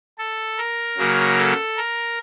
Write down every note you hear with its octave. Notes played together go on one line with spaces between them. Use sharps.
A4
A#4
C#3 F#3 A#3
A4
A#4